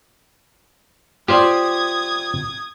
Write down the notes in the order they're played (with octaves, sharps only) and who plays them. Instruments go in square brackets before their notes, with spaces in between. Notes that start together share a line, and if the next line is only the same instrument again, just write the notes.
[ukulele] F4 [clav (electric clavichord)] G4 C5 D5 [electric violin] D#6 G#6